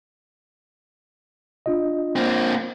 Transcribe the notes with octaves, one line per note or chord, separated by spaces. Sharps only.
D4 F4 D#5
A#3 C4